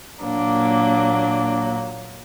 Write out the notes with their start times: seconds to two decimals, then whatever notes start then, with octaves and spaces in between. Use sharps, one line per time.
0.22 A#2 F#3 A#3 D4